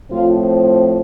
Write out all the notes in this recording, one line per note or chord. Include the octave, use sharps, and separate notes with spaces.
A2 F3 C4 F4